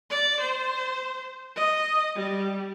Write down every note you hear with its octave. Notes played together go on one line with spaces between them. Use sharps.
D5
C5
D#5
G3